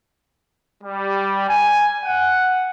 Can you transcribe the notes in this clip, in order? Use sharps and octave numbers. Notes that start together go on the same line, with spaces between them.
G3
G#5
F#5